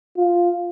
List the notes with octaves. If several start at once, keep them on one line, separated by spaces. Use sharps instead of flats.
F4